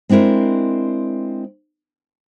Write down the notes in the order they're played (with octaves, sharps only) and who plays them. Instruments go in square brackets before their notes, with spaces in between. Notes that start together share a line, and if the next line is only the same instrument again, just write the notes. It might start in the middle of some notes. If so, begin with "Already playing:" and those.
[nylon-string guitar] G#3 C4 D4 E4 A#4